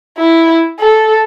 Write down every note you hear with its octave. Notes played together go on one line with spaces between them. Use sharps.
E4
A4